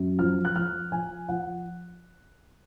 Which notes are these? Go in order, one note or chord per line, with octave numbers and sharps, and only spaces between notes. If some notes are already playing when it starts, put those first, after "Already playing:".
Already playing: F#2
F3 F6
F#6
F3 F6
F3 G#5
F3 F#5